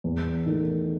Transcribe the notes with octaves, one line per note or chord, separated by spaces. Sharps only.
E2
D#3 A3